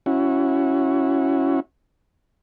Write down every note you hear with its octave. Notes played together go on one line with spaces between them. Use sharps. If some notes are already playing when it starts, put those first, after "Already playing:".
C#4 E4 F#4